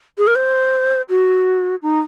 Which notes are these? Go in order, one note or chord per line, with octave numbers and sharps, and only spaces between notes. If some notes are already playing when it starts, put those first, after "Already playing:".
G#4
A#4
C5
F#4
D#4